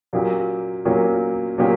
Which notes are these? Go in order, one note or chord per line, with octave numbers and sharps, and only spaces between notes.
A#2 F#3 A#3 C#4 G4
A#2 F#3 A#3 C#4 G4
A#2 F#3 A#3 C#4 G4